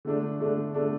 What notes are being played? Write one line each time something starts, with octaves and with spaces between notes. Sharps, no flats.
D3 A3 D4
D3 A3 D4
D3 A3 D4